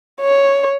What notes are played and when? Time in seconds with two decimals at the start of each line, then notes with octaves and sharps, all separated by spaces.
0.21 C#5